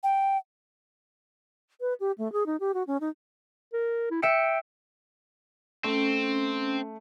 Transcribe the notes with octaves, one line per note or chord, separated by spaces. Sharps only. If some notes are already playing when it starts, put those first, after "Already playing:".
G5
B4
G4
A3
G#4
D#4
G4
F#4
C#4
D#4
A#4
E4
E5 G5 C#7
A3 C4 C#4